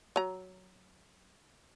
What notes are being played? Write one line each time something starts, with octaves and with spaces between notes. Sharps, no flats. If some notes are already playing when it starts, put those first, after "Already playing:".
F#3 A#5